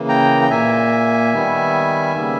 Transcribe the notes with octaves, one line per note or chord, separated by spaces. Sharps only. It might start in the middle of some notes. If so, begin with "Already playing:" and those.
Already playing: C#3 E3 A#3
G5 A#5
G5
A#2 A#3 E5 G#5
D#3 G3 B3
C#3 G3 A#3